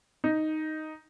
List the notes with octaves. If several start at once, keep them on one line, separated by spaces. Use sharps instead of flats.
D#4